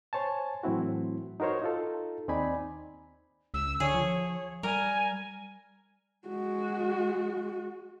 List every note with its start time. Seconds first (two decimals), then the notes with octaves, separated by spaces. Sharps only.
0.13 C5 C#5 G#5 A5
0.63 A2 E3 F#3 C4 E4 F#4
1.40 D#4 F#4 A#4 C5 C#5
1.62 D#4 F4 A4
2.28 D#2 C4 D#4 D5 G#5 B5
3.54 C#2 E6
3.80 D3 G#4 C#5
3.94 F3
4.63 G3 A#4 G#5
6.28 G#3 F#4